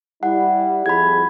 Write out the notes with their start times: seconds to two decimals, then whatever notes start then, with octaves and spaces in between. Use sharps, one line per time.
0.23 G3 E4 F#5
0.86 F2 G#4 B5 G#6